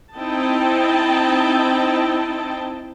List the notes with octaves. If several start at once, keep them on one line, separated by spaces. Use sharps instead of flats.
C4 D#4 E4 D#5 G5 A5